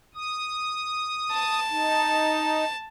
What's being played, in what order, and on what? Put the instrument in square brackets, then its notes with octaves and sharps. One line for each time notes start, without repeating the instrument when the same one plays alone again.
[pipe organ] D#6
[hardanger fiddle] A5
[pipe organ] D#4